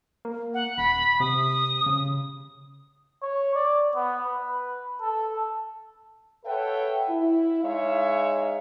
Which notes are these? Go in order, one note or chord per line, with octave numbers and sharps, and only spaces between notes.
A#3
F#5
D#1 B5
C3 D#6
C#3
C#5
D5
B3
B4
A4
A4 B4 C#5 E5 F#5 G5
E4
G#3 D#4 C#5 E5 F5